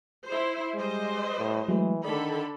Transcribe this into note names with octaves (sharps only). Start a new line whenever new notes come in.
E4 C5
G3 G#3 C5 D#5
A2
E3 F#3 G#3 A3
D3 D#3 A4 D5 B5